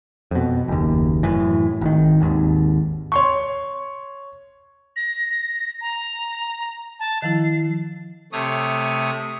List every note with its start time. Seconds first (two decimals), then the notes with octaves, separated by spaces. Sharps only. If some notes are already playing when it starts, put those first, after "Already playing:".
0.31 F2 B2
0.68 F#1 D#2
1.23 F#2 A2 E3
1.81 G#1 D#3
2.21 G#1 D#2
3.12 C#5 C6 C#6
4.96 A#6
5.81 A#5
7.00 A5
7.22 D#3 F3 E4 C7
8.32 C3 A3 C#5 D#6